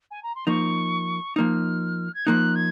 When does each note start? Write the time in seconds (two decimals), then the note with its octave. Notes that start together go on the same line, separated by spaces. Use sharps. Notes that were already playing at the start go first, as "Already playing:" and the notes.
0.11 G#5
0.23 A#5
0.35 C6
0.47 F3 A#3 D#4 C#6
1.36 F3 A#3 D#4 F6
2.15 G#6
2.26 F3 A#3 D#4 F#6
2.55 G#6